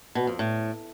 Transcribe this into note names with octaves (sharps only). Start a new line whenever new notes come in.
B2
F2
A2